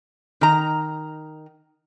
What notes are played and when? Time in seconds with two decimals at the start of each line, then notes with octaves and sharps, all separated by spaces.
0.41 D#3 A#5